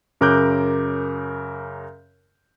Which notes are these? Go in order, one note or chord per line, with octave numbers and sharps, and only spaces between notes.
F#2 C#3 A#4 D6 F#6 G6